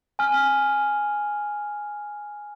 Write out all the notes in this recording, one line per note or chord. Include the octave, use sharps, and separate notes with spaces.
G#5 F6